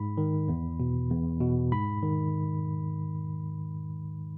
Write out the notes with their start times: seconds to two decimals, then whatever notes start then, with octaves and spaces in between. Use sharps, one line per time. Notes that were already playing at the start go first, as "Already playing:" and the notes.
Already playing: G#2 B5
0.18 D#3
0.48 E2
0.80 B2
1.10 E2
1.41 B2
1.72 G#2 B5
2.03 D#3